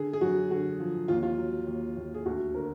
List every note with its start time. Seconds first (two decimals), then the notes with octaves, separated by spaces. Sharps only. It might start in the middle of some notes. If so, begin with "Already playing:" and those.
Already playing: D3 G#4
0.13 G#4
0.21 F#2 F#4
0.51 D3 F#4
0.80 F3
1.08 D#2 F4
1.23 F4
1.38 F#3
1.67 D#2
1.96 D#2
2.14 G#4
2.25 D2 F#4
2.54 D3 A#4